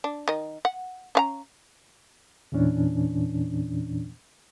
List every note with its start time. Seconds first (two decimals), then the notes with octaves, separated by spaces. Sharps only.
0.04 D4
0.28 D#3 D#5
0.65 F#5
1.15 C#4 F5 A#5
2.52 E2 A#2 E3 C#4 D4